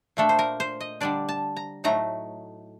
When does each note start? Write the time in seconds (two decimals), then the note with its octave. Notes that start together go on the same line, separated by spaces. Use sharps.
0.17 A#2 A3 D4 A4
0.29 C5
0.39 A#4
0.60 C5
0.80 D#5
1.01 D3 G3 D4 D5
1.29 A5
1.56 A#5
1.84 A2 F#3 A3 D#4 A#5